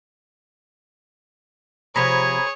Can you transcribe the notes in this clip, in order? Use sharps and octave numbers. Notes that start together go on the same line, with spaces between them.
C3 F3 G#4 C#5 A#5 B5